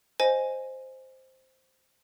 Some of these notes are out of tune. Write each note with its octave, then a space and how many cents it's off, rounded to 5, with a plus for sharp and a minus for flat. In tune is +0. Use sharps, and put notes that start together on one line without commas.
C5 +0 D#5 +0 G#5 +0